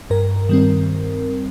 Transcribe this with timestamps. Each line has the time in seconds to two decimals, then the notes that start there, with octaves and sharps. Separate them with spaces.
0.10 G2 A#4
0.49 D#3 G3 C4